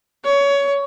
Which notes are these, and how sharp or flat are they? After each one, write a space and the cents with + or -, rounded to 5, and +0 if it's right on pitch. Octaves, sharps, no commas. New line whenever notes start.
C#5 +20